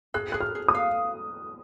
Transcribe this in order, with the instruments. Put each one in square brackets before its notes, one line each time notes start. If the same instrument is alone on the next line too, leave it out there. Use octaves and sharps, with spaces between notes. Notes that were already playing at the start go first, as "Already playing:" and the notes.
[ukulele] G#4 [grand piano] F#6
[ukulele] G#4 [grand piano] F#6
[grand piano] F6
[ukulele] G#4
[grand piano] D#6
[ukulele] F5